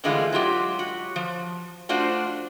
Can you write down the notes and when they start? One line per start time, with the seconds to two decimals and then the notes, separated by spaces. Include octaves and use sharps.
0.04 A2 D3 E3 G3 G#3 F4
0.32 F#3 G#3 F4 G4
0.79 F#4
1.16 F3
1.89 A3 D4 F4 F#4 C5